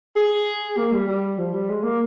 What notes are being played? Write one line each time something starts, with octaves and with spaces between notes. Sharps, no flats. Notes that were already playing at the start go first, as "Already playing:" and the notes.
G#4
A#3
G3
G3
F3
G3
G#3
A#3